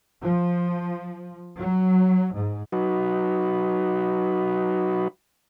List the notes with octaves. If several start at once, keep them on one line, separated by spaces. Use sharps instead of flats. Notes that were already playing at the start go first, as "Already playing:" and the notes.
F3
F#3
G#2
F#3 D#4 F#4 B4